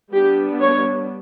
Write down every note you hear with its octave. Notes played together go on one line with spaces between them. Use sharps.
G3 B3 D4 G4
C#5